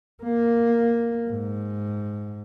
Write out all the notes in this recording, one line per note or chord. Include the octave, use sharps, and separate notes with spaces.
A#3
G#2